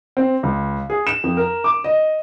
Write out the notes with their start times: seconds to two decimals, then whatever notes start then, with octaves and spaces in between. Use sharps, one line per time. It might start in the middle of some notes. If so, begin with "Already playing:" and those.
0.17 C4
0.43 C#2
0.90 G#4
1.07 E7
1.24 F2
1.37 A#4
1.64 D6
1.84 D#5